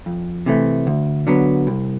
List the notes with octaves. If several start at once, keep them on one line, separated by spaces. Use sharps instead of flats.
F2
C3 E3 A3
D2
D3 F#3 B3
C2